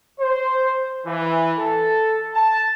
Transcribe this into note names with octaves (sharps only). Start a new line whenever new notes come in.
C5
E3
A4
A5